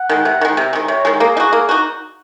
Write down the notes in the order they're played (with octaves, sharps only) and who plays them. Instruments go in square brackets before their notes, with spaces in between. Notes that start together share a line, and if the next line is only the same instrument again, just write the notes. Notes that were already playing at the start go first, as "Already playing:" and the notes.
Already playing: [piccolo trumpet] F#5
[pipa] D#3 G#3
C3
D#3 G#3
C3
D#3 G#3
[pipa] C3 [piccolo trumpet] C#5
[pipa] D#3 G#3
[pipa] A#3 [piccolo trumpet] G#4
[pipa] D#4
F#4
A#3
D#4 F#4